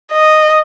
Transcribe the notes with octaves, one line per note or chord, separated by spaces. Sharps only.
D#5